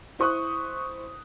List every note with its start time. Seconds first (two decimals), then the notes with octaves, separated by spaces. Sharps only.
0.19 E4 C5 C#6 D#6 F#6